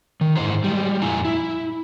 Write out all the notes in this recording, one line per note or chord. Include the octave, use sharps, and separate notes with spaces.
D#3
G#2 D#4 E4 C5 A#5
G3 G#3
F2 A#2 E4 G#5 A#5
E4